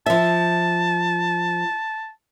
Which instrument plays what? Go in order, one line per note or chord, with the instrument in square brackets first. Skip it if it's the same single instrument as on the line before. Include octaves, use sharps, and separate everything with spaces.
[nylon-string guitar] F3 E5 [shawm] A5